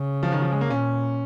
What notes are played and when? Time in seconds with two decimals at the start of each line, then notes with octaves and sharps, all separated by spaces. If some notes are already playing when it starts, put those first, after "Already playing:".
Already playing: C#3
0.23 F3
0.32 D#3
0.42 F3
0.52 G#3
0.61 A#3
0.70 A#2 C#4